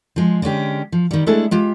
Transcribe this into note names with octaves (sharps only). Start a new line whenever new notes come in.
F3 G#3
D3 G#3 C#4 G4
F3
D#3 G3
G#3 A3 D4 E4 G#4 A4
G#3 F4 G4